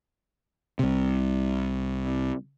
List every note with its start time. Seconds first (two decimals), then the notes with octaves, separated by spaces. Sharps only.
0.79 C2 C3